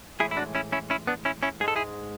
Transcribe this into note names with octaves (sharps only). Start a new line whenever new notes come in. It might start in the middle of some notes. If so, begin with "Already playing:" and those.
A2 E3 G#3 E4 G#4
E4
D4 F#4
C#4 E4
C#4 E4
C#4 E4
B3 D4
C#4 E4
C#4 E4
G#2 G#3 G#4 A4
E4 G#4